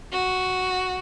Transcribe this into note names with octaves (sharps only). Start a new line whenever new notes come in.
F#4